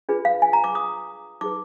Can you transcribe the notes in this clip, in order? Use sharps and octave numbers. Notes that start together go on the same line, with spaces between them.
D4 F4 G#4 B4
F5
G#5
A#5
D6
D#6
D#4 G#4 B4 D6